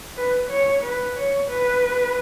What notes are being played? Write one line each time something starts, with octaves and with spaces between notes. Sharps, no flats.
B4
C#5
B4
C#5
B4